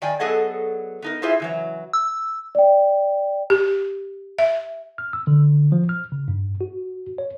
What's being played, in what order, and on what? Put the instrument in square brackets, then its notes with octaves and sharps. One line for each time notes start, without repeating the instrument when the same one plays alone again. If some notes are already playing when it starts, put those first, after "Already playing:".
[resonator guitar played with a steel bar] D#3 D5 G5 G#5
F#3 B3 G#4 A4 D#5 F#5
B3 D#4 A#4
E4 F4 G#4 C5 E5
C#3 E3 F#3
[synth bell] E6
[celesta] D5 G5
[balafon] G4
E5
[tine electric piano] F6
E6
D3
F3
F6
C#3
G2
F#4
C#5